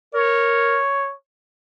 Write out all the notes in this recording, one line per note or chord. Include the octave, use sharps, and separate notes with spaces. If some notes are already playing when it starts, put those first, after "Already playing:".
A#4 C#5